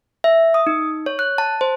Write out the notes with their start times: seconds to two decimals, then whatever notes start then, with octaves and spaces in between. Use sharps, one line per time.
0.24 E5
0.54 D#6
0.67 D#4
1.06 C#5
1.19 F#6
1.38 A5
1.61 C5